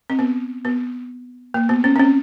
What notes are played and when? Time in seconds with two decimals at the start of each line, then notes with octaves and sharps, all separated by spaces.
0.10 C4
0.19 B3
0.65 B3
1.54 A#3
1.69 B3
1.84 C#4
1.96 C4
1.99 C#4